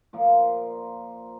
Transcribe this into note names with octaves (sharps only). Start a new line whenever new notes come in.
A#2 F3 A#3